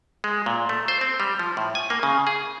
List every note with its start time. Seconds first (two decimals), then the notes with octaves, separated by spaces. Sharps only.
0.24 G#3
0.46 A#2
0.69 A3
0.88 C5
1.01 C4
1.20 G3
1.39 F3
1.57 A2
1.75 G#5
1.90 A#3
2.03 C#3
2.27 G#4